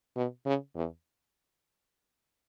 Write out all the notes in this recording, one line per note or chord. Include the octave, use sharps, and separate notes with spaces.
B2
C#3
E2